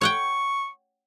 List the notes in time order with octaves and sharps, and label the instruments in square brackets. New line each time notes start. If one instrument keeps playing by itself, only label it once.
[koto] C#5 F#5 G5 [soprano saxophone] C#6